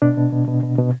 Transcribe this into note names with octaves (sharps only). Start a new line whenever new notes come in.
B2 D4
B2
B2
B2
B2
B2